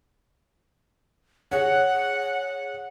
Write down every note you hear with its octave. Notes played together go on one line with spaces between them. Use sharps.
G#4 C#5 F#5